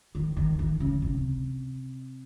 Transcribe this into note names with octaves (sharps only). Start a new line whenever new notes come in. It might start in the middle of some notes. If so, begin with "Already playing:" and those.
D#3
D#3
D#3
C#3
C3